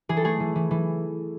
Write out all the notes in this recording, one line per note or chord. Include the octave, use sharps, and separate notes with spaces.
E3 G#4
A4
A3 G#4
E3
E3
E3